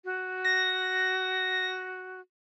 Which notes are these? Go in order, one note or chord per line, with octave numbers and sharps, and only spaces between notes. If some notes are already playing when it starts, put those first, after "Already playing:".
F#4
A#6